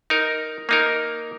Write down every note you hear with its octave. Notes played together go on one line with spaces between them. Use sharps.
D#4 A#4
A#3 D#4 A#4